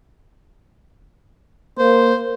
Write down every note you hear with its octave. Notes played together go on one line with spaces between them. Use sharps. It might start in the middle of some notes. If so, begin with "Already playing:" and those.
A#3 C5